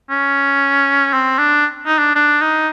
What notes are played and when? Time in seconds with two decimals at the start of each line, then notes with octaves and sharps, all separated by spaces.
0.10 C#4
1.14 C4
1.39 D4
1.86 D#4
1.99 D4
2.15 D4
2.42 D#4